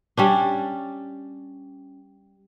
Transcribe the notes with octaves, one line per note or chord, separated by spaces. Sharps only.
G3 C#4 D4